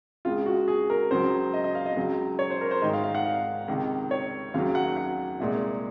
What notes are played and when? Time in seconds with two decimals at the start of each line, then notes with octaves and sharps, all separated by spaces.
0.25 C#2 C#3 G#3 F4
0.46 F#4
0.68 G#4
0.90 A#4
1.11 C#2 C#3 F#3 C5
1.53 D#5
1.64 D#5
1.75 F5
1.86 D#5
1.96 C#2 C#3 F#3
2.39 C#5
2.50 C5
2.61 A#4
2.71 C5
2.82 G#2 D#3 G#3 D#5
2.93 F5
3.04 F5
3.15 F#5
3.25 F5
3.68 C#2 C3 D#3
4.11 C#5
4.54 D#2 C#3 F#3 F5
4.75 F#5
4.97 F#5
5.40 C2 A#2 G#3